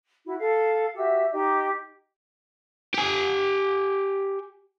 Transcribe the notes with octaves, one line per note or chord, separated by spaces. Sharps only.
E4 F#4
A4 F5
F#4 G4 E5 E6
D#4 G4 D#5
G4 G#5